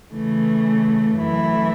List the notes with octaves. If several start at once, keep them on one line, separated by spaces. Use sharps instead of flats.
C#3 E3 A3
F#2 E3 A3 E4